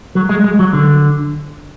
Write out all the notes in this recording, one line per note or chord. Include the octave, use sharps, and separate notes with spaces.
F#3
G#3
G#3
F#3
D3